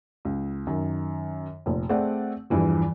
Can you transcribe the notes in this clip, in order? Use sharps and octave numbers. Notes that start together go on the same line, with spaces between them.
C#2
F#2 D#3
F1 A#2
A3 C4 G#4 D5 F#5
E2 G2 E3 F3